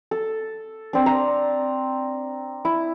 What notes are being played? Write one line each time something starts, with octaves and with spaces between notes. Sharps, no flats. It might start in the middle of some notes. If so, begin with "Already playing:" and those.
A4
C4 D4
A#5
E4